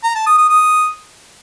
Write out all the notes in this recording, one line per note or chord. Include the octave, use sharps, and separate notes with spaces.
A#5
A5
D#6
D#6
D#6